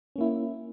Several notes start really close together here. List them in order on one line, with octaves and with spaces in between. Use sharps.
C#4 A#3 E4